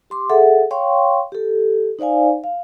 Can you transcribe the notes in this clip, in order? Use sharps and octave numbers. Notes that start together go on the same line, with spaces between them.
G4 C6 D6
G#4 A4 E5 F#5
C#5 F5 G5 C6 C#6
G4 A4
D#4 C5 D5 F5 G#5
F5